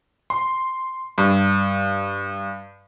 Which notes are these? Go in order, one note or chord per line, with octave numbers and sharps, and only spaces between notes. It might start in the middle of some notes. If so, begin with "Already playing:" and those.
C6
G2